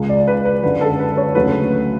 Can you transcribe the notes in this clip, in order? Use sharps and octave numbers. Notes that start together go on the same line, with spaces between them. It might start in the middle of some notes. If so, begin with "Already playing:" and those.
Already playing: C#2 C#3 G#3
D5
B4
B4
F#2 D3 G#3 D4 B4
A4
B4
C#5
D2 C#3 F#3 A3 B4